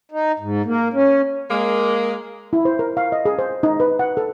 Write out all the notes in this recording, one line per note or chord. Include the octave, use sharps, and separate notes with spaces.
D#4
G#2
A#3
C#4
G#3 A#3
E4
C5
A#4
F5
D#5
G#4
C5
D#4
B4
F#5
A4